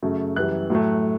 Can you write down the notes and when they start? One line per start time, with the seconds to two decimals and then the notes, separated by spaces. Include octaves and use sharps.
0.02 F#2 C#3 F#3 A3
0.36 F#2 E3 G3 F#6
0.70 A2 F#3 A3